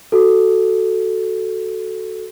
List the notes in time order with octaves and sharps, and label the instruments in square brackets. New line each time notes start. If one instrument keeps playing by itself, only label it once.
[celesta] F#4 A4